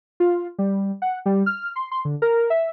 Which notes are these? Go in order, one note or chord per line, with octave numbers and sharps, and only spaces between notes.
F4
G3
F#5
G3
F6
C6
C6
D3
A#4
E5